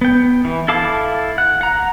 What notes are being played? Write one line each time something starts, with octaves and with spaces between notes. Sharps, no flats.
B3 G5
E3
E4 A4 F5 A5 D6
F#5
F#5 A#5